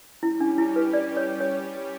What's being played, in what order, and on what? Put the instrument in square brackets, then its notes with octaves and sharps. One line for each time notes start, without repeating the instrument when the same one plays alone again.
[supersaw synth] G3 C#4 G4 [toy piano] E4
[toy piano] D4
E4
B4
D5
C#5
C#5